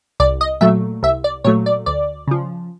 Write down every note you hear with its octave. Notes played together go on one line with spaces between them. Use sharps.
C2 D5
D#5
A#2 F#3 A3 E5
C2 E5
D5
A#2 F#3 A3 C#5
D5
D2 D5
C#3 F3